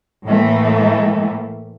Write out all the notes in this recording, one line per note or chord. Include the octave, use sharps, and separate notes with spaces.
A2 E3 A3 A#3